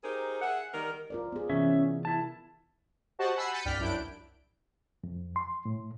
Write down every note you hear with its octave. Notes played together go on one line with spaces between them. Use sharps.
D#4 G4 G#4 A#4 C5
G#4 E5 F#5
D#3 G3 A#4
F4 A#4 D5
B3 G#4
C3 E3 B3 C#4 E5
E4 A5
F#4 G4 C5 D#5 F#5 A5
F#5 G#5 B5 E6 C7
G6 A6 B6 C#7 D#7
C2 G2 D5 G5 F6 B6
C2 F#2 D4 E4 G6 D7
F2
C6
A2